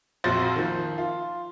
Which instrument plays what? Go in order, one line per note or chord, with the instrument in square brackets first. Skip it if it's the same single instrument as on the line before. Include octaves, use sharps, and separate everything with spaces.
[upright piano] A#1 F2 F3 F#4 C5 A6
D#3 F3
F4